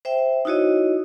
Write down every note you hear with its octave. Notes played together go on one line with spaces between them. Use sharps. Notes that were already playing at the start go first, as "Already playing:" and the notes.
C5 E5 G5
D#4 E4 F#4 C#5 D#5